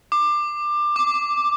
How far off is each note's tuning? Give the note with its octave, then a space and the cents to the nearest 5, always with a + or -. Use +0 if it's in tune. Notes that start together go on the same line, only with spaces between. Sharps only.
D6 +20
D6 +0